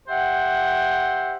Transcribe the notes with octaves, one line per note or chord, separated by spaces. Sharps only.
G4 C5 E5 F#5